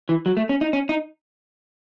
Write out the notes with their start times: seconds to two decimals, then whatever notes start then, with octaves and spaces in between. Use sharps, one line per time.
0.09 E3
0.26 F#3
0.37 A3
0.49 C#4
0.61 D#4
0.73 C#4
0.89 D#4